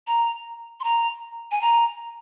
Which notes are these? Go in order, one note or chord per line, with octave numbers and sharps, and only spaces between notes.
A#5
C6
A#5
G#5
A#5